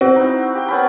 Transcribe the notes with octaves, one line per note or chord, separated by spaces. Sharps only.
C4 F#4
D#4 E4
G4 G5
B3 C#4 B5